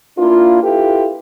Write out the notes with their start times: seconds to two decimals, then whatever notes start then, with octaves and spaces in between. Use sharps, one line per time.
0.18 A#3 D4 E4 F4
0.62 E4 F4 G4 A4 B4